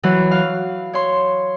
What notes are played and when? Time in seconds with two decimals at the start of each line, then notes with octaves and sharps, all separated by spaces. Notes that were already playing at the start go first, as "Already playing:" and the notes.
0.03 E3 F#3
0.31 F5
0.93 C#5 C6